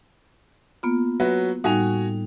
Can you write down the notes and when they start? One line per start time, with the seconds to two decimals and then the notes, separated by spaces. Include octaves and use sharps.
0.83 A#3 B3 F4
1.20 F#3 F#4 B4
1.64 A2 G3 D#4 F#4 G#5 F7